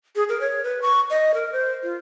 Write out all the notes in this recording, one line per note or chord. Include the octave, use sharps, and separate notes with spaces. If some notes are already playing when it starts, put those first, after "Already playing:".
G#4
A#4
C#5
B4
C#6
D#5
A#4
C5
F4